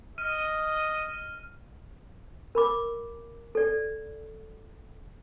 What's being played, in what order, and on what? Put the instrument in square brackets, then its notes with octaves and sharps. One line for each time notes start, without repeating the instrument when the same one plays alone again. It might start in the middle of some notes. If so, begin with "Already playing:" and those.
[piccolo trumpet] D#5 [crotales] F6 D#7
[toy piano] A#4 B5 D6
A4 D5